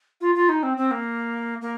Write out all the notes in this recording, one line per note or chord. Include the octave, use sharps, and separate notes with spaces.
F4
F4
D#4
C4
C4
A#3
A#3